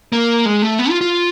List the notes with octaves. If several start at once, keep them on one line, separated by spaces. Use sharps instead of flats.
A#3
G#3
A3
B3
F4
F4